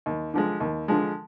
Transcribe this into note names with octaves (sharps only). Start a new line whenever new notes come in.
D#2
D3 F3 G#3
D#2
D3 F3 G#3